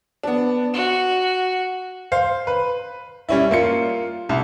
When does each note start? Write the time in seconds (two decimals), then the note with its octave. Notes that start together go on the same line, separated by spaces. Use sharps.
0.23 B3 D4
0.74 F#4 E7
2.12 C5 F5
2.47 B4
3.29 G3 C#4 E4
3.51 A#3 F4 C#7
4.29 C2